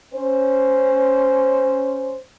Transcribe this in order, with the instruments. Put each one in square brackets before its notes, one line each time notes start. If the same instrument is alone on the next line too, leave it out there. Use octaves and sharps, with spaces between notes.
[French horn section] C#4 C5